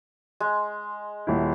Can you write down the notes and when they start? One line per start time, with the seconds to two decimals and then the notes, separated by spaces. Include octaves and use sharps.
0.40 G#3
1.27 D#1 E4